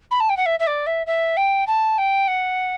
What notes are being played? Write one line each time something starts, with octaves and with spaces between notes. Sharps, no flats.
B5
A5
G5
F#5
E5
E5
D5
E5
E5
G5
A5
G5
F#5